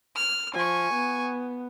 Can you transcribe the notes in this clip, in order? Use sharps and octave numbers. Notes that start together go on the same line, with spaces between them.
F6
F3 G#5 C#6
B3